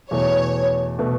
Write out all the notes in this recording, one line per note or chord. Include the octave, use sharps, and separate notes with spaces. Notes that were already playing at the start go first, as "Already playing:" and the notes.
E2 B2 A3 C#5
B2 A3